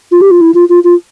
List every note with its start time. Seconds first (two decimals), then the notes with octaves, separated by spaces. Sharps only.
0.12 F4
0.21 G4
0.31 F4
0.41 E4
0.54 F4
0.69 F4
0.84 F4